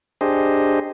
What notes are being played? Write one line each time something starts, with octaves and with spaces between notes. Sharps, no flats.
D4 G4 G#4 C5 D#5